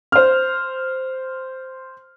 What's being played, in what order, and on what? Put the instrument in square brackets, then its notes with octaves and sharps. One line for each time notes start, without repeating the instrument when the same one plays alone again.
[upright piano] C5 F6